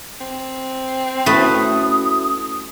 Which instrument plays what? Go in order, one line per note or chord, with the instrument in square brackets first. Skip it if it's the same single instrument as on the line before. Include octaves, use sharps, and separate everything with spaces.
[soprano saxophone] C4
[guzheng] A3 B4 [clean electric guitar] C#4 E4 F#4 [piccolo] D#6